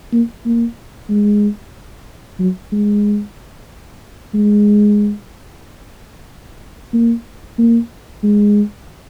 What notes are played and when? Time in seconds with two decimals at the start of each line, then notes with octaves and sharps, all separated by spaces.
0.12 A#3
0.45 A#3
1.09 G#3
2.39 F#3
2.72 G#3
4.34 G#3
6.94 A#3
7.58 A#3
8.23 G#3